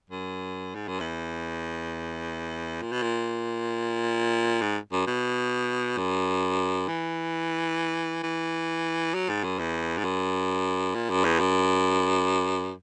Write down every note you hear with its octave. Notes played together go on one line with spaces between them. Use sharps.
F#2
G#2
F#2
E2
A#2
B2
A#2
G#2
F#2
B2
F#2
E3
E3
F#3
G#2
F#2
E2
G#2
F#2
A#2
F#2
E2
F#2